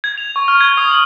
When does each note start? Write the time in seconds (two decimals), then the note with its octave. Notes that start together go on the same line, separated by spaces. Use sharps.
0.04 G#6
0.18 F7
0.36 C#6
0.48 F6
0.61 G#6
0.77 D#6
0.91 F#7